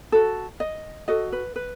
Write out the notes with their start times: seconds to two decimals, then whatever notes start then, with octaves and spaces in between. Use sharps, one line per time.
0.12 F#4 A4
0.60 D#5
1.08 F#4 A4 D#5
1.33 B4
1.56 B4